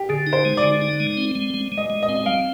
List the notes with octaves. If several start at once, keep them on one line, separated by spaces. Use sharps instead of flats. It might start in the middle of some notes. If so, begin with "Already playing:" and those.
Already playing: G4
D3 G#4
D#4
C5
G#3
D5
D3
D#4
G#3
C4
G#3
G#3
G#3
D#5
G#3
D#5
C4
D#5
G3 F5